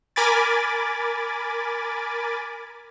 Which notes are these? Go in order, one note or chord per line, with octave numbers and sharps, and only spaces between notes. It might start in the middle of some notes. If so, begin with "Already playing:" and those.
A#4 G#5 B5 D6 A6